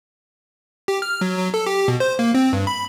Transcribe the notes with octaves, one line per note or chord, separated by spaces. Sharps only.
G4
F6
F#3
F#3
A4
G4
B2
C5
A#3
C4
G2
B5